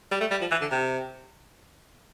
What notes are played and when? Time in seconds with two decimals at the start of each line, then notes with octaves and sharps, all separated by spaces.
0.11 G3
0.20 A3
0.31 G3
0.41 F3
0.51 E3
0.61 D3
0.71 C3